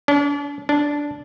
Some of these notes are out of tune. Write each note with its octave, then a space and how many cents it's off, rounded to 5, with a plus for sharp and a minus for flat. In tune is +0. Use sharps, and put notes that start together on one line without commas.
D4 -40
D4 -10